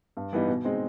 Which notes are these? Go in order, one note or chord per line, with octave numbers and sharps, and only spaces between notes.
G2
E3 G3 B3 D#4
B2
G#3 C4 D#4